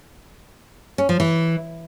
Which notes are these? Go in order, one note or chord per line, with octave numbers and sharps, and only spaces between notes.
C#4
F3
E3